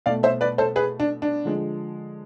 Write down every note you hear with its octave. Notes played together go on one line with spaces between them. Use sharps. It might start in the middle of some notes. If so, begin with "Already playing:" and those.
B2 A3 D5 F5
C5 E5
B4 D5
A4 C5
G#4 B4
D4
D4
D3 F3 G#3